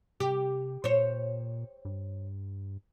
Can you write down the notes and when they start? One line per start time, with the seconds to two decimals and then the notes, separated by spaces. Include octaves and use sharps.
0.20 C3 G4
0.84 A#2 C5 C#5
1.85 G2